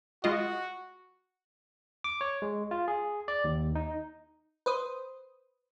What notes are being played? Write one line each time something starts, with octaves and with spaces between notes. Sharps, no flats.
G#3 F4 F#4 D#5
D6
C#5
G#3
F4
G#4
D5
D#2
D#4
B4 C5 D#6